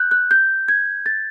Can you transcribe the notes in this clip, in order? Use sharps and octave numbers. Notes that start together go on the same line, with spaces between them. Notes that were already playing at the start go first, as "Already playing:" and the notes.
Already playing: F#6 G6
F#6
G6
G#6
A6